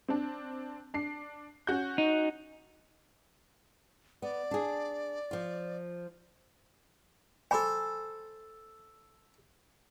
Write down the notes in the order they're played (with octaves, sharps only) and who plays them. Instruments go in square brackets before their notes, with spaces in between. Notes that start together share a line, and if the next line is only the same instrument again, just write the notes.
[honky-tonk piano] C4 D4
D4 C7
C#4 F#4 G6
[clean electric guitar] D#4
[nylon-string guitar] B3 [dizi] D5
[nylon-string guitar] D4 G#4
F3 F4
[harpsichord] A4 C5 [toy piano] G#5 B5 D6